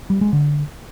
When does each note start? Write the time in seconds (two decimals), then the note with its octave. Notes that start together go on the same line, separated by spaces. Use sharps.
0.10 G3
0.21 G#3
0.33 D3